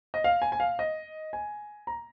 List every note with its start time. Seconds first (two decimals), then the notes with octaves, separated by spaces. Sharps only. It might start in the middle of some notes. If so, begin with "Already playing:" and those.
0.14 D#5
0.24 F5
0.42 G#5
0.52 G#5
0.60 F5
0.79 D#5
1.33 G#5
1.87 A#5